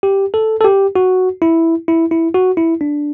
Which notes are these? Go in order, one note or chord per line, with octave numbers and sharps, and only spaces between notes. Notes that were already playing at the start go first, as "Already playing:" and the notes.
G4
A4
A4
G4
F#4
E4
E4
E4
F#4
E4
D4